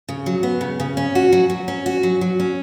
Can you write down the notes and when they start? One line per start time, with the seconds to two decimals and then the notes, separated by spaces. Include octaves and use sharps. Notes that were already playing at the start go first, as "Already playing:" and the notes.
0.09 C#3
0.26 F#3
0.43 B3
0.61 C#3
0.80 C#3
0.97 C#4
1.15 F#4
1.33 F#3
1.50 F#3
1.68 C#4
1.86 F#4
2.03 F#3
2.21 F#3
2.40 C#4